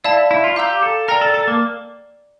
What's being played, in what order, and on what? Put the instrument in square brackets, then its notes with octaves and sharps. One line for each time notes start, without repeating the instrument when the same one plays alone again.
[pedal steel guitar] E4 [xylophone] D5 F5 A5
[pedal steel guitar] E4
F4
[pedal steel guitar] G4 [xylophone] F5 A#5 E6 G6
[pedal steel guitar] A4
[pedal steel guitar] A#4 [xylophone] D5 G5 A#5 F6
[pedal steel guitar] A4
A4
A#3